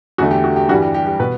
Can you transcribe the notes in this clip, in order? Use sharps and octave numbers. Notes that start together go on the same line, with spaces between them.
E2 D3 A3 F#4
G4
F#4
G4
G2 E3 G3 F#4
G4
G4
G4
B2 B4